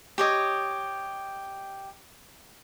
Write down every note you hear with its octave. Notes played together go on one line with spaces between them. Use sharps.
G4 C#5 D#5